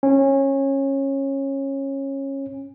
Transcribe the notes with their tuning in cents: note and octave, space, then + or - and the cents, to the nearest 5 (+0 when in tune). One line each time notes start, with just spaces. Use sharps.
C#4 -20